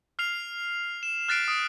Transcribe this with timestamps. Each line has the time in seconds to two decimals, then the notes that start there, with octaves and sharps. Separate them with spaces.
0.19 F6 C7 F7
1.03 E7
1.28 F6 F#6 A6 B6 C7 D7
1.48 D#6 D7